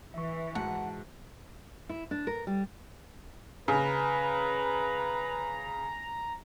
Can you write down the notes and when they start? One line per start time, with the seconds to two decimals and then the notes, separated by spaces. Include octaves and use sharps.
0.14 E3 E5 C#6
0.55 G#2 F#4 F#5 A5
1.89 E4
2.11 D4
2.27 A#4
2.47 G3
3.68 C#3 B4 A#5